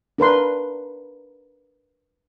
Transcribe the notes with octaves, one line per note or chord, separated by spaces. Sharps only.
D4 A#4 B4 C6